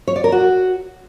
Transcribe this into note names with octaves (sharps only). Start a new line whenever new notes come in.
C#5
D5
A#4
F#4